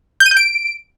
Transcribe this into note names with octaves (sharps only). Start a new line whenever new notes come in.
G6
D#7
G6
D7